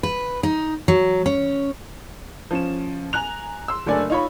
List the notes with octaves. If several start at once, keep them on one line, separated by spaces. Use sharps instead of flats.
B4
D#4
F#3
C#4
F3 C#4 E7
G#5 A#5 F#6 F7
C6 E6
F#1 A3 D4 D5 G#5
D#4 F4 C#5 D#5 B5